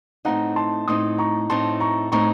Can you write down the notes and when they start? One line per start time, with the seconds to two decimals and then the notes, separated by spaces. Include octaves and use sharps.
0.25 A2 A3 C4 D#4 F#5 A#5
0.56 A5 C6
0.88 A2 A3 C4 D#4 C6 D#6
1.18 A#5 C#6
1.50 A2 A3 C4 D#4 A5 C6
1.80 A#5 C#6
2.12 A2 A3 C4 D#4 A#5 C#6